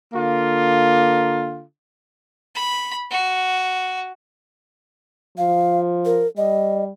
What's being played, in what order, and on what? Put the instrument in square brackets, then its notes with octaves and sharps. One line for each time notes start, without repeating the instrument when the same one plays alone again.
[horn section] D3 A#3 F4
[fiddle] B5
F#4
[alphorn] F3 [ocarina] F5
[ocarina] A#4
[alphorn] G3 [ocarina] D#5